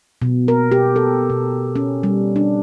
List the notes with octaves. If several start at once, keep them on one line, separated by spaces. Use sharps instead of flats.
B2
A#4
G4
A4
B2
C#4
G3
D4